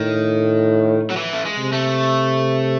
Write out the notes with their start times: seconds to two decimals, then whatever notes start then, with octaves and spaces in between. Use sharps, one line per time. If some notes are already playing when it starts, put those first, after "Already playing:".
Already playing: A2 D#3
1.10 F#3
1.17 E3
1.33 A3
1.45 G#3
1.58 C3
1.73 A3